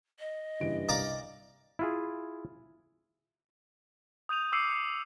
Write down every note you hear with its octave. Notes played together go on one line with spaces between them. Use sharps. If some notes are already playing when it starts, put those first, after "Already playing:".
D#5
F#1 G2 E3 D7
C2 D5 F5 A#5 D6
E4 F4 G#4
D#6 G6 D#7 F7
D6 E6 C7 C#7 D#7
G6 C#7
C#7